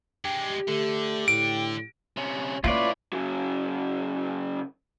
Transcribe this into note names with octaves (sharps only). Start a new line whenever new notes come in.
G#3 D4 G4
D3 A3
A2 D7
C3 C#4
A#3 C#4 E4 F4 B4 C#5 D5
C#3 F#3